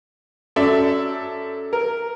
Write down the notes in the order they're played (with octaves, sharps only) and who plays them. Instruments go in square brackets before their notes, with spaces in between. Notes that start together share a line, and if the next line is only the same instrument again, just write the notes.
[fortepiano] F#2 [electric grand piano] A4 D5 E5
[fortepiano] A#4